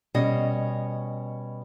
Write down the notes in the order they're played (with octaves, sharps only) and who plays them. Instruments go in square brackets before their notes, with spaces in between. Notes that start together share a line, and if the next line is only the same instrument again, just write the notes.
[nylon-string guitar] B2 G3 C#4 D#5